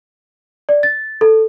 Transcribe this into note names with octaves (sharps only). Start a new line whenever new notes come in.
D5
A6
A4